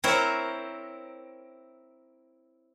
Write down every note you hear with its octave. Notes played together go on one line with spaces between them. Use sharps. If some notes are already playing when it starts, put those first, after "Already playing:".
C4 E4 A#4 C5 C#5